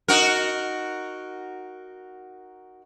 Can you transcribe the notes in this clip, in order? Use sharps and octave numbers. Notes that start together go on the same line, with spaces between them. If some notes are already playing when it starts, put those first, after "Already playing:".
D#4 F#4 A#4